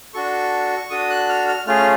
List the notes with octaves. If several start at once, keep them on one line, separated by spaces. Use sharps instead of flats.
D4 F#4 A4 C#6
D4 F#4 A4 D#6
F#6
F6
F6
A3 C#4 F4 G#4 F6